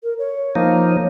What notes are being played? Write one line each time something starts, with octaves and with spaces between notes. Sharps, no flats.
A#4
C#5
F3 A#3 D#4